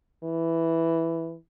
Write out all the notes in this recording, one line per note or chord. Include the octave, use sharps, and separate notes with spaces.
E3